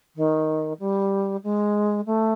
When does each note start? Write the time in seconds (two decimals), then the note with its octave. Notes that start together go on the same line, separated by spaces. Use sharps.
0.16 D#3
0.79 G3
1.43 G#3
2.06 A3